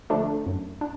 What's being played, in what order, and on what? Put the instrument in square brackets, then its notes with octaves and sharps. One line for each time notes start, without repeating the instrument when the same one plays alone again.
[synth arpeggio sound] D3 F3 A3 D4
F#2
D4